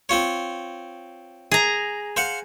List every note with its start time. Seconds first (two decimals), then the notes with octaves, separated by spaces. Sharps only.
0.09 C4 F4 C#5
1.52 G#4 A#5
2.17 C5 F5 F#5